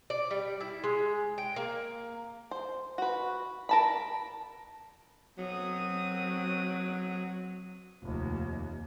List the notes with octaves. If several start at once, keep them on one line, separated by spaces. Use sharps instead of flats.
D5
G3
E4
G#3
G5
A#3
C5
F#4 B4
A#4 A5 B5
F#3 C4 D#6
F1 D#2